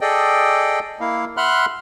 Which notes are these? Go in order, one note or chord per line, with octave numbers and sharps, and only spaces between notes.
G#4 A4 D5 D#5 G5
A#3 E4 F5
E5 F#5 B5 C6 F6 F#6